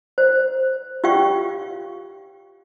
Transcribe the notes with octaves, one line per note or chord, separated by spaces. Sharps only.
C5
F4 G4 F5 G5 C#6